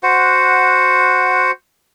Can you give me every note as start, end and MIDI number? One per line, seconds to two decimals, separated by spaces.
0.03 1.51 66
0.03 1.51 72
0.03 1.51 78